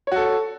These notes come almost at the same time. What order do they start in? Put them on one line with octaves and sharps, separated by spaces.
C#5 F#4 A4